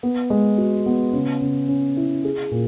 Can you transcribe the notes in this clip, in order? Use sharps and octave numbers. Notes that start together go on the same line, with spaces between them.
B3
G#3
F#4
B3
C#3
C#3
C#4
E4
G#4
A#2